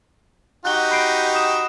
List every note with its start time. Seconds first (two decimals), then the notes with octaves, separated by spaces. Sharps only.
0.65 D#4 F#4 G4 F#6 G7
0.91 B5 C7 D7
1.35 D#6 E7